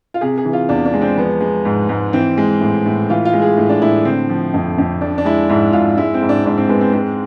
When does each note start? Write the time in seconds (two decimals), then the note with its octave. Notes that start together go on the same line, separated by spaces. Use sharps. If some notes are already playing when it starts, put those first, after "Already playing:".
0.14 F4
0.21 C3 G#4
0.38 G#4
0.45 E3
0.53 F4
0.69 E2 D4
0.85 D4
0.94 G#3
1.02 C4
1.17 F3 B3
1.41 G#3
1.65 G#2
1.89 G#2
2.13 E3 C4
2.37 G#3
2.61 A2
2.85 A2
3.09 E3 F4
3.25 F4
3.33 G#3
3.42 G#4
3.57 A2
3.69 D4
3.82 A2 E4
4.05 D3 C4
4.29 F3
4.54 F2
4.78 F2
5.01 F3 D4
5.18 D4
5.25 G#3 E4
5.49 G#2 E4
5.73 G#2 F4
5.98 G#3 E4
6.14 C4
6.21 G#2
6.29 D4
6.45 G#2 D4
6.58 C4
6.69 G#3 B3
6.81 C4
6.93 G#3 C4